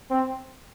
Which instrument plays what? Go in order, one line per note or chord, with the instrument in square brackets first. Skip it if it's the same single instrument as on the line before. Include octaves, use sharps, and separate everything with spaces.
[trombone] C4